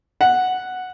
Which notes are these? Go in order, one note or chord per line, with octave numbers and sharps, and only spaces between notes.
F#5